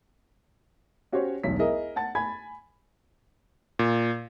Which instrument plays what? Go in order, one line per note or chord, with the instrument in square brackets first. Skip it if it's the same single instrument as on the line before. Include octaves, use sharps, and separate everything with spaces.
[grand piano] C#4 F#4 G4 C5 C#5
E1 B1 D#4 B6
E4 G#4 A#4 D#5 E5
F#5 A5 A6
G#5 B5 G#6
[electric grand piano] A#2